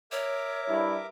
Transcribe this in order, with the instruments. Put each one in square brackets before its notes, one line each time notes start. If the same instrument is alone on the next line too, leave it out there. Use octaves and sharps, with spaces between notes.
[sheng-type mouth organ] A#4 E5 D6 [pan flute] C#5
[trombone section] G2 E4